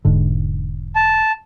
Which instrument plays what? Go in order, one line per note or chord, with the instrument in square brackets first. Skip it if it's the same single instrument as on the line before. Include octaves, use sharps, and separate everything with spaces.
[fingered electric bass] E1 G#2 D3
[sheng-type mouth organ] A5